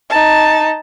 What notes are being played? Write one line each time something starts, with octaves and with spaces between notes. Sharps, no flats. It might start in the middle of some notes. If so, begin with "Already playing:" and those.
D#4 A5